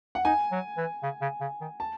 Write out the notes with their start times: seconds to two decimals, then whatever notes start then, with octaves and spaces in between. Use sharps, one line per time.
0.15 F#5
0.24 D#4 G#5
0.51 F#3
0.77 E3
1.03 C#3
1.21 C#3
1.41 C#3
1.61 D#3
1.80 A5